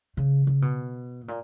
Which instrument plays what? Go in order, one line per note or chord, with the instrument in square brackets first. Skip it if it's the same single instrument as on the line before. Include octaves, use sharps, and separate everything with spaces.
[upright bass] C#3
C#3
B2
A#2